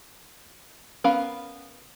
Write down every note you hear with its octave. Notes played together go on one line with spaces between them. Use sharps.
B3 C#4 A#4 F5 B5